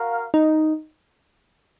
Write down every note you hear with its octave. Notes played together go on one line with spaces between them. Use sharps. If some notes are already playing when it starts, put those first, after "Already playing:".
Already playing: F#4 A#4 F5
D#4